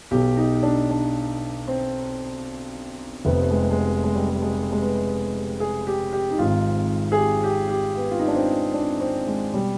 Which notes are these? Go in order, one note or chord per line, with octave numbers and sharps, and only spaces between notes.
B1 B2 G4
D#4
D4
D4
C4
F1 F2 C3 B3
B3
G#3
G#3
B3
G#3
G3
G#3
G#3
G#3
B3
G#4
G4
G4
D#4
G#1 G#2 D#3 F4
G#4
G4
G4
G4
B3
F4
D#4
D4
C4
D4
C4
G#3
B2 G3